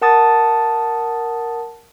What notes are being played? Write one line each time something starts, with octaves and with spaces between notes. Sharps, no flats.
A#4 F#5 A5 D#6 A6